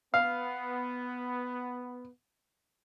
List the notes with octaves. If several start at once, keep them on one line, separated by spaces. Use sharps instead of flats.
B3 F5